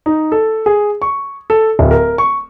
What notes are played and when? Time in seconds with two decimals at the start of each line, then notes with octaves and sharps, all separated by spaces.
0.06 D#4
0.32 A4
0.66 G#4
1.02 C#6
1.50 A4
1.79 D1
1.91 A#4
2.18 C#6